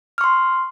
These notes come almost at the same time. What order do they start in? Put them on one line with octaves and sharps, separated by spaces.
F6 C#6 C6